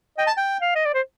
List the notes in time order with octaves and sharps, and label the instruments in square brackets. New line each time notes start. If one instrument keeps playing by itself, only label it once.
[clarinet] D#5 [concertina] G5
[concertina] A5
G5
[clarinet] F5
D#5
D5
C5